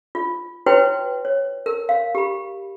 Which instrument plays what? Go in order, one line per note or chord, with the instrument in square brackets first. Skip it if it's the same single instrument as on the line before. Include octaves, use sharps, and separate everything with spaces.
[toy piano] F4
E4 F#4 B4 C#5 G5
C#5
A#4
F5
G4 B5